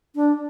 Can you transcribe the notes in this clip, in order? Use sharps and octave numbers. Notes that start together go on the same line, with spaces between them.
D4